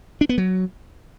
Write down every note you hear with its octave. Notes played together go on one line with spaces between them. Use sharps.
D4
B3
F#3